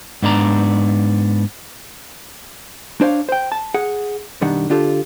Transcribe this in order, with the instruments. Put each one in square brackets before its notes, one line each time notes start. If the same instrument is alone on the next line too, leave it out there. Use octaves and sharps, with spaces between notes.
[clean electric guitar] G#2 B3 D4 D5 A#5
[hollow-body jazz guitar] D4 C5 C#5 F5
C5 G5
A5
G#4 F#5
B1 F#2 D#3 G3 D4 F#5
D3 D4 F4 G4 A4